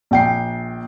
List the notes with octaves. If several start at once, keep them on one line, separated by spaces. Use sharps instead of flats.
A#1 G5 C7